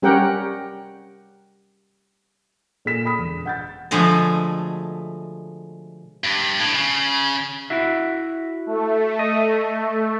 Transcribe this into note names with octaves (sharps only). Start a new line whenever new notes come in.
G3 C#4 G4 A#4 F#5 G5
A#2 G#4 A4 B6 E7
B5 D#6 B6
E1
F#5 G6 A6
B2 D3 F3 G#3 A3
G2
A2
C#3
E4 F#4 E5
A3
D#5